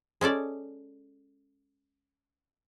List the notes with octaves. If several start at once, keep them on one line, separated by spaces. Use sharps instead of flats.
G#3 C#4 A4 D5